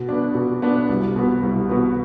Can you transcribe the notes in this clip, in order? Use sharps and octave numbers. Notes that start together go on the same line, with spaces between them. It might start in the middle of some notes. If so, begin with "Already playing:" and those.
Already playing: B2
B3 D4
B2
B3 D4
C2
B2 B3
C2
B2 B3